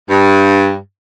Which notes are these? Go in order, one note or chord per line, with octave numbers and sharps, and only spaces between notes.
G2